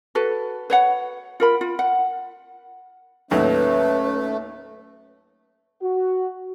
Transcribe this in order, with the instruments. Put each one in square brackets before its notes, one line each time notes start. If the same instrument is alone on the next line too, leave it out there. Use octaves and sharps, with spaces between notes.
[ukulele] F#4 A4 B4
B4 C#5 F#5
F4 A#4 B5
F4
F#5
[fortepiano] D#2 A2 F#3 [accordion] A3 [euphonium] C#4 [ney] B4
[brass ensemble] F#4